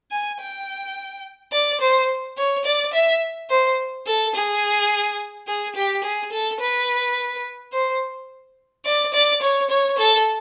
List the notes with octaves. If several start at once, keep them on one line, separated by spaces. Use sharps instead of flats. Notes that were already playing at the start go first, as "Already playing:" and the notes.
G#5
G5
D5
C5
C#5
D5
E5
C5
A4
G#4
G#4
G4
G#4
A4
B4
C5
D5
D5
C#5
C#5
A4